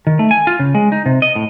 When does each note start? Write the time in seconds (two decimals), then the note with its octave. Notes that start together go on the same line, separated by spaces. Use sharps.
0.07 D#3
0.19 A3
0.31 G#5
0.47 F4
0.59 C#3
0.75 G#3
0.92 D#4
1.06 C3
1.22 D#5
1.36 A2